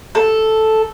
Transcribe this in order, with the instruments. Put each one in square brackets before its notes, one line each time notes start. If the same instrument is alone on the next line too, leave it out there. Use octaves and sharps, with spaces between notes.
[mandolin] A4